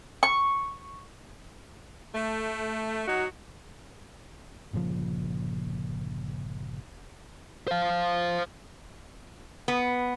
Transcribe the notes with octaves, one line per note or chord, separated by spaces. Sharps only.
C#6
A3
F#3 D#4 F#4
G1 A#2 C#3 F3
C5 F5
B3